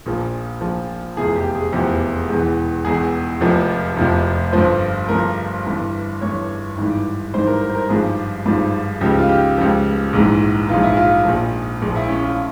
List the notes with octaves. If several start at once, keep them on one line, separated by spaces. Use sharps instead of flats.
A#1 A#2 F3
A#1 A#2 F3
F1 E2 C3 F3 G#4
G#4
G4
G#4
F1 E2 C3 F3 G4
E1 E2 E3
E1 E2 E3 G#4
F1 F2 C3 F3
F1 F2 C3 F3
G1 G2 F3 C5
G1 G2 F3 A#4
G1 G2 E3
G1 G2 E3 C#5
G#1 G2 E3
G#1 G2 E3 C5
A#4
A#4
C5
A#4
G#1 G2 F3 G#4
G#1 G2 F3
C#2 C#3 F3 G4
F4
G4
C#2 C#3 F3 G4
A#1 G#2 E3
A#1 G#2 E3 F4
E4
F4
A#1 A#2 F3
A#1 A#2 F3
E4
C#4
F4